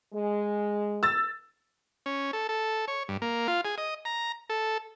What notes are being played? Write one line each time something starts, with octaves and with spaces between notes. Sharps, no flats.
G#3
E6 A6
C#4
A4
A4
C#5
G2
A#3
F4
G#4
D#5
A#5
A4